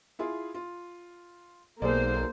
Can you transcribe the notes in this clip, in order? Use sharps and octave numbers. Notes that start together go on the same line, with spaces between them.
E4 F4 G#4
F4
B1 A#3 G#4 A4 C5 D5